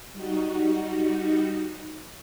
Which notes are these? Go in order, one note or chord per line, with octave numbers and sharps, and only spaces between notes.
G3 D#4 F#4